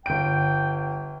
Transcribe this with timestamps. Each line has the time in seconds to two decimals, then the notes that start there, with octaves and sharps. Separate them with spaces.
0.06 G1 G5 D7